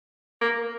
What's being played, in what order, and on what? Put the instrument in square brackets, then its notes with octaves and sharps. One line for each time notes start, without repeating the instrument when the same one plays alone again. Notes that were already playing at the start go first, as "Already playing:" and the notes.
[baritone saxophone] A#3